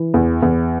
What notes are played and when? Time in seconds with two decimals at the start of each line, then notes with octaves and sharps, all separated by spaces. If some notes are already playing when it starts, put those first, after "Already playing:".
Already playing: E3
0.14 E2
0.42 E2